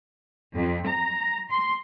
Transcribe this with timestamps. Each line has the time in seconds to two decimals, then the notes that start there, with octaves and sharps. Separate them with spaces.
0.53 F2
0.87 A#5
1.50 C6